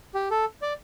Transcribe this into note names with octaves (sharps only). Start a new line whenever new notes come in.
G4
A4
D5